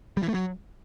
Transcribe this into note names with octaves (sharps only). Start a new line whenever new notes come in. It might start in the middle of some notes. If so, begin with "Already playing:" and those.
G3
E3
A3
F#3